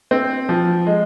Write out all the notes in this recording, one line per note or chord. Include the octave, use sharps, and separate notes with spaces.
C4
F3
G#3